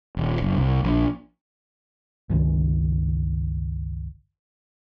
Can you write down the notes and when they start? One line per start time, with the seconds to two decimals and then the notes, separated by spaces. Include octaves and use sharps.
0.17 D#1
0.42 F#1
0.57 C2
0.84 A#1
2.30 G1 C#2 D#3 C#4